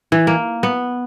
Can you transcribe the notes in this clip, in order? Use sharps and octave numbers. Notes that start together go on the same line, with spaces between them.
E3
A#3
B3